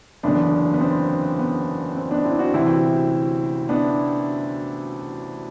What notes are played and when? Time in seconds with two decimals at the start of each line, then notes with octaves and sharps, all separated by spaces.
0.23 F#1 E2 D3 B3 D4
0.74 B3
0.81 C4
1.39 B3
1.96 C4
2.11 B3 D4
2.25 C4 E4
2.39 D4 F#4
2.54 D2 C3 E3 C4 E4
3.69 B3 D4